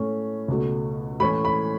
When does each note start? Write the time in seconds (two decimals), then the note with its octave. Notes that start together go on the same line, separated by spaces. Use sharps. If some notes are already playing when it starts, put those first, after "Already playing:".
Already playing: A2 A3 C#4
0.48 C#2 B2 A3
1.20 A2 E3 C#4 B5
1.45 B5